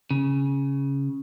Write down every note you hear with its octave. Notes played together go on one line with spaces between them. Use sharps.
C#3